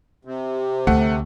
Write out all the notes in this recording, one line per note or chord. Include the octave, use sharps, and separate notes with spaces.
C3
D2 A3 F#5